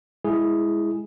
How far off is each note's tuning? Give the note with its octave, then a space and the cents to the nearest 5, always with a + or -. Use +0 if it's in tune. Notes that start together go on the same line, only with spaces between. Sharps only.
G#3 +0 E4 +0 G#4 +0